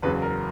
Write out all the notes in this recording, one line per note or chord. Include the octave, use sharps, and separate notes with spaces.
F#1 E2 C#3 F#3 B4
A#4